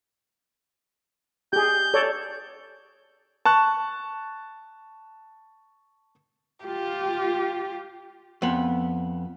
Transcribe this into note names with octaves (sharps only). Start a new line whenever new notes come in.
G4 G#4 G6
A4 C#5 D5
A5 C#6 F#6
F4 G4
F2 B3